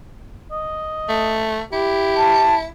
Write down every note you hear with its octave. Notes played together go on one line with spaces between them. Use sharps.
D#5
A3
E4 G4
A5